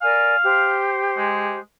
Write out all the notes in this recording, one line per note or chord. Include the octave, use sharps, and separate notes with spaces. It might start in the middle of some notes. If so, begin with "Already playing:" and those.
A#4 D5 F5 G#5
G4 C5
G#3